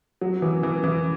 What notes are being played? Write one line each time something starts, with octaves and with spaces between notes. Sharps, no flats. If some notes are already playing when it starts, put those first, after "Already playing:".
F#3
E3
E3
E3